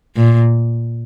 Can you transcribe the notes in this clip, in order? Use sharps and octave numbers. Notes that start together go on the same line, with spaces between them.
A#2